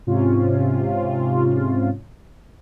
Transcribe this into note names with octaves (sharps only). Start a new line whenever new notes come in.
G#2 C3 C#4 F4